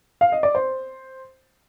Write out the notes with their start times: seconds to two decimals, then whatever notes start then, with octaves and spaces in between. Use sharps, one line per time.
0.21 F5
0.32 D#5
0.43 D5
0.55 C5